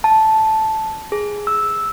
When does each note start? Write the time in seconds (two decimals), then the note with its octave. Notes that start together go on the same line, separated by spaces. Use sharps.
0.04 A5
1.12 G#4
1.47 E6